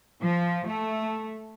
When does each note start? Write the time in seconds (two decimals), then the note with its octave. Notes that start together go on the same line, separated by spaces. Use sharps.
0.22 F3
0.66 A3